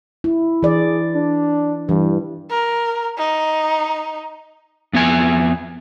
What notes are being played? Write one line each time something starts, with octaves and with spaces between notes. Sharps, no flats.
E4
E3 G#4 D5
D4
G2 E3
A#4
D#4
F2 B3 E5 G#5